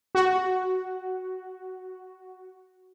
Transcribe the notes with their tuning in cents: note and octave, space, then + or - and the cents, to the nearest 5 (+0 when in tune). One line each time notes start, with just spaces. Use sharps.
F#4 +5